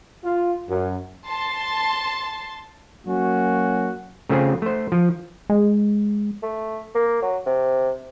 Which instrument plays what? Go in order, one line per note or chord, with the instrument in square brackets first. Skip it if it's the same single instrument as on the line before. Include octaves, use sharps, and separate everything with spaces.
[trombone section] F4
F#2
[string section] A5 C6
[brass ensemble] F#3 A#3 C#4 F#4
[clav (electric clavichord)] C#3 A3 C4 F4 G#4
A3 C5
F3
[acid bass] G#3
[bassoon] A3
A#3
F#3
C3